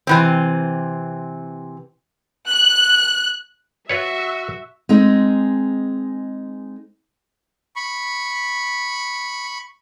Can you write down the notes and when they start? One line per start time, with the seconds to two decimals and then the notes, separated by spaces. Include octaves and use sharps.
0.07 C3 E3 C4
2.50 F#6
3.89 F4 F#4 B4 C#5 E5
4.89 G#3 C4 D#4 G#4
7.76 B5 C#6